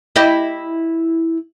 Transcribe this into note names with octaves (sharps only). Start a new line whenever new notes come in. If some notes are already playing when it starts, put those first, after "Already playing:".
E4 G4 D#5